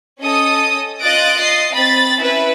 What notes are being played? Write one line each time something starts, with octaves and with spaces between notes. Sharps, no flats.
C#4 A4 D#5 D#6
F4 D#5 F#6 A6 A#6 D7
D#5 A6 C7
C4 B5 A6
C#4 E4 B4